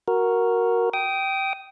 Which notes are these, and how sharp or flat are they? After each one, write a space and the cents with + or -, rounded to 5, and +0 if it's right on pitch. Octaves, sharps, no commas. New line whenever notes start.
F#4 +0 A#4 +0
G5 -15 D#6 +5